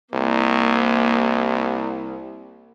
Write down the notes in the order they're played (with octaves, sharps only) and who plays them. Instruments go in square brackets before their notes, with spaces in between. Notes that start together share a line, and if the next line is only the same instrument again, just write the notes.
[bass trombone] C2 [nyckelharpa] A#3